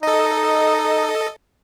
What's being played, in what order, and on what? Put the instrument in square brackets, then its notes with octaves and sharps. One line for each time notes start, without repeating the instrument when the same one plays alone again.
[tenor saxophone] D#4 [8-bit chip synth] A4 D#5